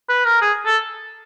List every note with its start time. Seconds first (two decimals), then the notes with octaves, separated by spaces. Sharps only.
0.09 B4
0.25 A#4
0.41 G#4
0.66 A4